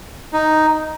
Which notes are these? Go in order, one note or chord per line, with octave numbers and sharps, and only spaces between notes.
D#4